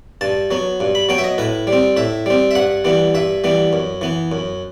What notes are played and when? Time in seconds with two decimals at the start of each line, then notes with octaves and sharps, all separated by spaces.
0.21 G2 A5
0.51 F#3 B3
0.80 G2
0.95 B5
1.09 F#3 B3 G5
1.18 E5
1.24 D#5
1.38 A2 B4
1.67 G3
1.73 C4
1.97 A2 E5
2.26 G3 C4
2.51 E5
2.55 G2 F#5
2.85 E3 G3 B3
3.14 G2 E5
3.44 E3 G3 B3
3.73 F#2
4.01 E3 B3
4.32 F#2